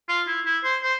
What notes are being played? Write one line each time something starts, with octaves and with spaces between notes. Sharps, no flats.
F4
E4
E4
C5
C5